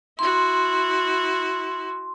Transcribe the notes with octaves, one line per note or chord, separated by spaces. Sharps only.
E4 F#4 C6